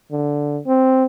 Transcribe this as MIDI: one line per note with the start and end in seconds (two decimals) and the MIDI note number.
0.11 0.60 50
0.67 1.05 60